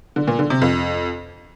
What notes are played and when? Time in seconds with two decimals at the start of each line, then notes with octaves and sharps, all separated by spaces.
0.16 D3
0.27 A#2
0.39 D3
0.50 C3
0.62 F2